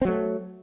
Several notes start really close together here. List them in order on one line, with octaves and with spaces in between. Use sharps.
C4 F#3 A3